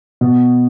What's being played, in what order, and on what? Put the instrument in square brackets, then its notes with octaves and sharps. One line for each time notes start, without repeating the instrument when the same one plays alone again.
[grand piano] B2